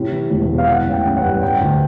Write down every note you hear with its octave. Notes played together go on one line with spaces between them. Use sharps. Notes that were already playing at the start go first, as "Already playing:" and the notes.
Already playing: A2 C3
E3
E1
E2
F5
E3 F#5
A1
G5
A1
F#5
G2
G3 G5
D2